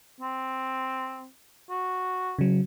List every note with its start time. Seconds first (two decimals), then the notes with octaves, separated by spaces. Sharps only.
0.21 C4
1.70 F#4
2.39 C#3 F#3